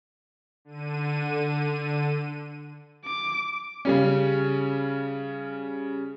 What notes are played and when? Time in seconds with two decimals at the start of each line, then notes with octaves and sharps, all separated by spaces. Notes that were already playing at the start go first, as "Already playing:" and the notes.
0.65 D3 D#7
3.05 D6
3.85 C#3 G3 C#4